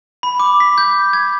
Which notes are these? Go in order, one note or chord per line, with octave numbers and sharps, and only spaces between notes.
B5
D6
B6
G6
G#6